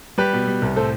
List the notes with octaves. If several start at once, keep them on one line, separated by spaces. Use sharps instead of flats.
G3 G4 B4
B2
G3
C2
A2 A4 C5